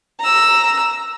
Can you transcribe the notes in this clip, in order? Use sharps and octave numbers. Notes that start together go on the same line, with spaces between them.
A#5 E6